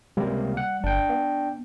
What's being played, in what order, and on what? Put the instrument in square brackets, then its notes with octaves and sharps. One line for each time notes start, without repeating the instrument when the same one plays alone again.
[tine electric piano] C#2 C3 A#3 [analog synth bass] G3
[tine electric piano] F#5
[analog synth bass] G1 [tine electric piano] D4 G5
[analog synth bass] B3